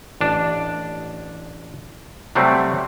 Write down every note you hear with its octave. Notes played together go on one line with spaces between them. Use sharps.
A1 D4
C3 F#3 G3 A3 C4